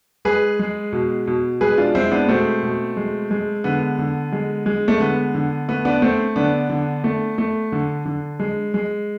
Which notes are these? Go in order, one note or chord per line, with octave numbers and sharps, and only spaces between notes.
G#3 G#4 B4
G#3
B2
B2
G#3 G#4 B4
D4 F4
G#3 C4 E4
B3 D4
B2 A3 C4
B2
G#3
G#3
D3 B3
D3
G#3
G#3
A3
D3 B3
D3
A3 B3
B3 D4
A3 C4
D3 B3 D4
D3
A3
A3
D3
D3
G#3
G#3